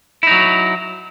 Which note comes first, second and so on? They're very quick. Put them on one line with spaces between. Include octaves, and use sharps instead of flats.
E4 D#4 F#3